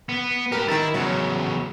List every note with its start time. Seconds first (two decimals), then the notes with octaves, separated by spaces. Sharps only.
0.09 B3
0.52 G4 A#4 B4
0.68 D#3 E4 A#5 A6
0.94 E2 C#3 F#3